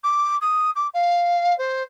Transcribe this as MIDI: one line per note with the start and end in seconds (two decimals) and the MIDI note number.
0.03 0.36 86
0.41 0.70 87
0.75 0.87 86
0.94 1.57 77
1.58 1.83 72